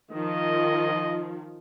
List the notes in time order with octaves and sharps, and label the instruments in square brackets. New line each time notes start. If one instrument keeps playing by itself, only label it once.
[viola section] D#3 F3 [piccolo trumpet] D#5